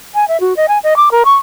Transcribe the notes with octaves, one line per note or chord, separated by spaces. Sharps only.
G#5
E5
F#4
D#5
G#5
D#5
D6
A#4
C#6